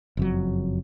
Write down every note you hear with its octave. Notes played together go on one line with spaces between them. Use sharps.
F#1 F2 F#3